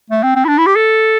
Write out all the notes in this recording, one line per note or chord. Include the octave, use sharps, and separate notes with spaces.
A3
C4
C4
E4
D4
E4
G4
A4